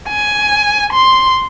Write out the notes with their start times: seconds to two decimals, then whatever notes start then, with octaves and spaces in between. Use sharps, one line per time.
0.09 G#5
0.93 C6